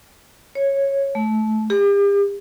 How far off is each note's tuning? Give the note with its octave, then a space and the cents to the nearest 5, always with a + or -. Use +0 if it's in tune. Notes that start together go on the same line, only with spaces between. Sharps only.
C#5 -10
A3 -20
G4 +40